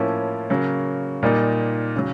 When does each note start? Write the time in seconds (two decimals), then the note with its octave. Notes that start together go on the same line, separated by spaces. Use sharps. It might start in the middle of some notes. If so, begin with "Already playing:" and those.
Already playing: A2 F3 A#3 C#4 E4
0.50 C#3 F#3 A#3
1.23 A#2 G3 A#3 D#4
1.96 C#3 F#3